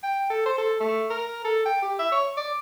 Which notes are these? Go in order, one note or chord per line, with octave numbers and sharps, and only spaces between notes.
G5
A4
C5
A4
A3
A#4
A4
G5
G4
E5
C#5
D5